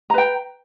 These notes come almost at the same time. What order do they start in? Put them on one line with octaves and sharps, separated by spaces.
A#5 B4 G5